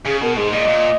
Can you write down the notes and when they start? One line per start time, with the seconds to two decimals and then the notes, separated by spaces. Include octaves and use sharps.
0.06 C#3 G#4
0.22 B2 A#4
0.37 G#2 G#4
0.53 A#2 D#5
0.68 A#2